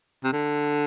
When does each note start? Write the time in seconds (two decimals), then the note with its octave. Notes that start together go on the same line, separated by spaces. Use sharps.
0.24 C3
0.33 D3